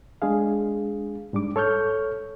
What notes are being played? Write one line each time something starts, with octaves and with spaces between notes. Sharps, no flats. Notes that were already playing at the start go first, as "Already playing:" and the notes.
G#3 D4 G#4 F5
G#2 G3 D4 D6
A4 C#5 C#6 F6 G6